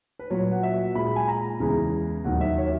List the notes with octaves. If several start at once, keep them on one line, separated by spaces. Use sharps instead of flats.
B4
A#2 F#3 C#5
F#5
E5
A#2 G#3 B5
G#5
A#5
E2 C#3 E3 G#3
D#2 D#3 F#3 F#5
E5
C#5